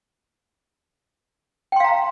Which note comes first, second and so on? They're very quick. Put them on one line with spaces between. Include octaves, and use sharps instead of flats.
G5 C6 F5 A#5